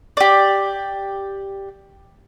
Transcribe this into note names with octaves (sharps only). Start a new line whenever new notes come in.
G4 D5